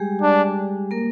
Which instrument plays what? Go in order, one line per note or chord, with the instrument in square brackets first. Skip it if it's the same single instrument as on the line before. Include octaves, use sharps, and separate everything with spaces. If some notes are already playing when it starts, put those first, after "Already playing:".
Already playing: [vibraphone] G3 G#3 G4 G#4
[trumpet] D4
[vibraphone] A#3 A#4